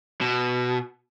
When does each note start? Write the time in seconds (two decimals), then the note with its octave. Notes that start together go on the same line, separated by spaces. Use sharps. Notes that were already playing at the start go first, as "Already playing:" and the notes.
0.21 B2